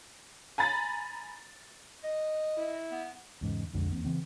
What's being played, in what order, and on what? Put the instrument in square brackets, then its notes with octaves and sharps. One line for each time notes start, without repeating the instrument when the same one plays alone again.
[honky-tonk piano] G#5 A#5 B5 A6
[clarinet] D#5
[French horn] E4
[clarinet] B3
[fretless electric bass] E2 G#2 C#3
B1 F2 D3 G#3
E2 A#3 C4
C#3 E3 B3 C4